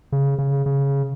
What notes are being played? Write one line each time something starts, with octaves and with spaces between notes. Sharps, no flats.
C#3
C#3
C#3